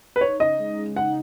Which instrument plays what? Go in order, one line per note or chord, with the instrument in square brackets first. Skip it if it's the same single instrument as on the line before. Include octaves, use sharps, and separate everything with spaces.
[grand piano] B4
[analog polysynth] D#4 [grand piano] C#5
[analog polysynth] C#3 [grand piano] D#5
[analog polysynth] G#3
C#3
[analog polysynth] D#4 [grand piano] F#5